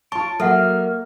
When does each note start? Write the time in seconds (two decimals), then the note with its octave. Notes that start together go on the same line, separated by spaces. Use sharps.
0.12 F4 C#5 A5 C#6 D7
0.40 F#3 A#3 A4 E5 F#5 F6